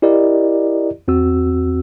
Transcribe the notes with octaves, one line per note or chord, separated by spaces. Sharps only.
E4 G4 A#4 D5 D#5
E2 C4 F#4 E6